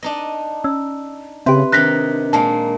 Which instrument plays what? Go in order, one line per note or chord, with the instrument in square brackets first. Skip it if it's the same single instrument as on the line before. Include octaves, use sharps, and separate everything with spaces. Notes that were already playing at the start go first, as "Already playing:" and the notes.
[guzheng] D4 D#4 D#5
[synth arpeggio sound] C#4 [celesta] E6
[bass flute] C#3 [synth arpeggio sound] C4 G4 [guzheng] B4 [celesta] E5 C6
[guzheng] C3 D#3 D#4 [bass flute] D4 [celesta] F#6 A#6 B6
[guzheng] A#2 G#3 A#3 [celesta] A5